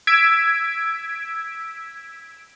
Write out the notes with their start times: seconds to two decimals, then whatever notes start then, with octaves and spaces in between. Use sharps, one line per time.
0.07 E6 G#6 B6 D7